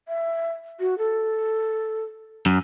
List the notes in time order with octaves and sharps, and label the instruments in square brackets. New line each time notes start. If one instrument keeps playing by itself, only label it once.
[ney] E5
F#4
A4
[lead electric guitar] F#2